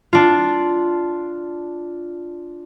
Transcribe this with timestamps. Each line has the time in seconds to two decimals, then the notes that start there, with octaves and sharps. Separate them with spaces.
0.13 D4 F4